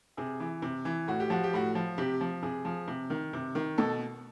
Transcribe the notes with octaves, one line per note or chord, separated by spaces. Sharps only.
C3 G#4
E3
C3
E3
A2 F#4
G4
F3 F#4
G4
A2 F#4
F3
C3 G4
F3
C3 G#4
F3
C3
D#3
C3
D#3
B2 A4